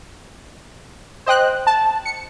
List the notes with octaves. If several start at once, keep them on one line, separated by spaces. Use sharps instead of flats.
C5 D#5 G5 F#6
A5
C#7